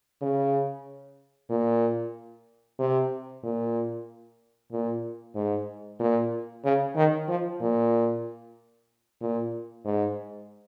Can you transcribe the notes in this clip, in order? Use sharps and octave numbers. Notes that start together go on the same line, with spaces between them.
C#3
A#2
C3
A#2
A#2
G#2
A#2
C#3
D#3
F3
A#2
A#2
G#2